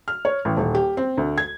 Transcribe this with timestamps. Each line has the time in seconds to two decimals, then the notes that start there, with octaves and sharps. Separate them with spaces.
0.08 F6
0.25 C#5
0.45 A1
0.57 D#1
0.75 G4
0.97 C4
1.17 D2
1.38 G#6